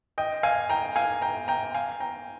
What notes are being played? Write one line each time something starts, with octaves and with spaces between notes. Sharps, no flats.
D#5 G5
F5 G#5
G5 A#5
F5 G#5
G5 A#5
G5 A#5
F5 G#5
G5 A#5